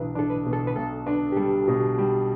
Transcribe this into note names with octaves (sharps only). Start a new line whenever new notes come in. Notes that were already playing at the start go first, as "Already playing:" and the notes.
Already playing: B1 B2 E3 F#3 D4 E4 B4
D4 A4
B4
B2
A4
B4
B1 A4
D4 B4
G4
G3 A4
B2 F#4
G3